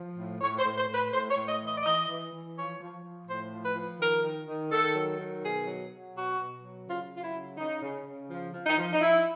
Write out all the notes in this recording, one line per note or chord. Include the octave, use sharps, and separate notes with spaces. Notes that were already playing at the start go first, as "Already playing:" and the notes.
Already playing: F3
A2
A2 C#5
C5
A2
C5
A2
B4
A2 C5
C#5
A2
D#5
E3
D#5
D5
E3 D#5
E3
E3
F3 C#5
F3
F3
A2 C5
F3
B4
F3
D#3 A#4
D#3
D#3
D#3 A4
F#3
D#3
B2 G#4
F#3
F#3
B2 F#4
B2
F#3
C#3 F4
F#3
F4
E4
C#3
C#3 D#4
C#3
C#3
F3
F3
D#4
F3
D#4
F3 E4